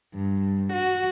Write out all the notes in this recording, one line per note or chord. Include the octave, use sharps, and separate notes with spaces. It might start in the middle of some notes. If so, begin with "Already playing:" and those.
G2
F#4